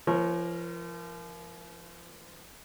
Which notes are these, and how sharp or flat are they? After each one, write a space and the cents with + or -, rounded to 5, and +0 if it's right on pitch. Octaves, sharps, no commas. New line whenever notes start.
F3 -35 A#4 +10 C#5 -30